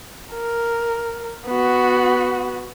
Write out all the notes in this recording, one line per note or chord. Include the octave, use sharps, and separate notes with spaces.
A#4
B3 F#4